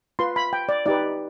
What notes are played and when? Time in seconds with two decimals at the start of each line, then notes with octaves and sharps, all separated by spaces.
0.19 F4 B4 C6
0.36 B5
0.53 G5
0.69 D5
0.86 D#4 G4 B4 D5